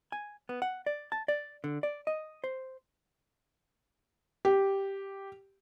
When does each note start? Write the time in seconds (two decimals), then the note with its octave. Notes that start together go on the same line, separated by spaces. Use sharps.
0.12 G#5
0.49 B3
0.62 F#5
0.86 D5
1.12 A5
1.28 D5
1.64 D3
1.83 D5
2.07 D#5
2.44 C5
4.45 G4